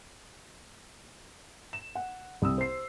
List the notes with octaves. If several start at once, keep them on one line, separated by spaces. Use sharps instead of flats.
E7
F#5
C2 D#6 E6
C5 C7